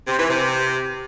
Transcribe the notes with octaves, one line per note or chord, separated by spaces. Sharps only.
C3
E3
C3